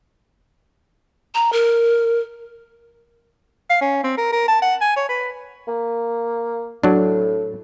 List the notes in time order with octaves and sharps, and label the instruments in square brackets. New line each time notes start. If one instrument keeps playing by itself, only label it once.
[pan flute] A#5
A#4
[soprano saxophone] F5
C#4
C4
A#4
A#4
A5
F#5
G#5
C#5
B4
[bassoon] A#3
[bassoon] A2 [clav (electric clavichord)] F#3 D4